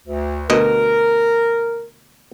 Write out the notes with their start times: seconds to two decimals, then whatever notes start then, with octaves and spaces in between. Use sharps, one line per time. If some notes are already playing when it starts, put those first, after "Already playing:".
0.07 D2
0.50 D2 B2 A#4 D#5